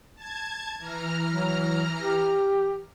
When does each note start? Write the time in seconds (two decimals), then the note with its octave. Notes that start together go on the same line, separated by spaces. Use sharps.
0.15 A5 G#6
0.78 E3 A#5 F6
1.28 F#3
2.02 G4